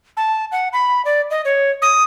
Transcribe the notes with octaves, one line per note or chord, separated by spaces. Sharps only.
A5
F#5
B5
D5
D#5
C#5
D#6